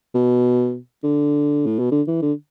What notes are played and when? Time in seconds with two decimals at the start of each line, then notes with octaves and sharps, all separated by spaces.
0.15 B2
1.04 D3
1.66 A2
1.79 B2
1.92 D3
2.07 E3
2.22 D3